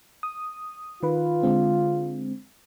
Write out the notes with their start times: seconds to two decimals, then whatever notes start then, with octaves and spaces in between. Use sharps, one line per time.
0.23 D#6
1.03 D#3 F4 B4
1.43 D3 G#3 C4